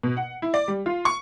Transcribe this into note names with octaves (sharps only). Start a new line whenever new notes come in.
B2
F#5
E4
D5
G3
F4
C#6